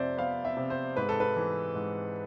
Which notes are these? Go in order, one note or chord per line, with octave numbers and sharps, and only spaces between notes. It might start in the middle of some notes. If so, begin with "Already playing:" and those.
Already playing: F2 C3 C5 D5 E5
B3 F5
E5
C3
C5
G#2 B4
A4
B4
E3
G#2